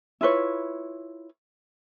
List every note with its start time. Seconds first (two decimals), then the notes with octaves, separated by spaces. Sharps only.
0.21 E4 F4 B4 C#5